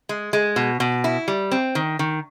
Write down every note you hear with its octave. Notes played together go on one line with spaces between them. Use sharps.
G#3
G#3
B2
B2
E4
G3
C4
D#3
D#3